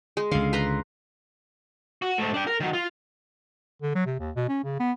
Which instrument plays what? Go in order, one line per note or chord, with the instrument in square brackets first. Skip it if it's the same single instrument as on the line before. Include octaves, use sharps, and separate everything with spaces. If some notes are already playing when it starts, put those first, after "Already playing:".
[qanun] G#3
[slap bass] C#2 D3 [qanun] F5
[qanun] B4 A#5 C6
[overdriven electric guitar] F#4
G#2 A3
D4 G5
A#4
D#3 F#3
F4
[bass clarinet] D3
F#3
C3
D#2
B2
C#4
C#3
B3